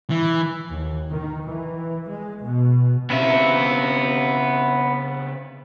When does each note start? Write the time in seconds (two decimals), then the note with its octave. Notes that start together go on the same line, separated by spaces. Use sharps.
0.10 E3
0.70 D#2
1.10 D#3
1.47 E3
2.08 G#3
2.44 B2
3.10 C#3 B3 C4 E5